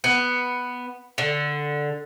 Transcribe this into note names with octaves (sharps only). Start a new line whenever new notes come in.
B3
D3